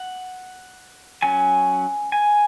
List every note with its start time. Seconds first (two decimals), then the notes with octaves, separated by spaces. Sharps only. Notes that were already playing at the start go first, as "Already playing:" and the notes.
Already playing: F#5
1.22 F#3 C#4 G#5
2.12 G#5